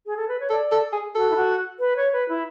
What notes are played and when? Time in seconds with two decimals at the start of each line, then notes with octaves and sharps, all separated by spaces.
0.06 G#4
0.16 A4
0.28 B4
0.39 C#5
0.50 A4 D5
0.72 A4
0.92 G#4
1.15 F#4 A4
1.30 E4
1.36 F#4
1.79 B4
1.96 C#5
2.12 B4
2.28 E4